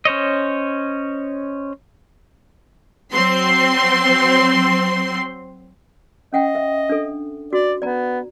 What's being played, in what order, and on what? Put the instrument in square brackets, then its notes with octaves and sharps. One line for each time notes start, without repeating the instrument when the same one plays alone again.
[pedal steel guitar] C#4 C5 C#5 D#5
[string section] F#3 C4 C6
[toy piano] C#4 F#5 G5 [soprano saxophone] D#5
[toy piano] E5
D4 A4
[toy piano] F#4 [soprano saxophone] D5
[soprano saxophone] B3 [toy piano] D5 A#5